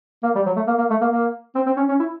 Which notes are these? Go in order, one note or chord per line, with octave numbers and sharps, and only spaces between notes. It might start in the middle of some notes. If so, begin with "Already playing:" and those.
A#3
G3
F#3
A3
A#3
A#3
A3
A#3
A#3
C4
C4
C#4
C#4
E4